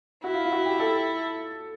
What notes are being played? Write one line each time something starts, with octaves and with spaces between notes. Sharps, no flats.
E4 F#4
F4
F4
F#4
G4
A4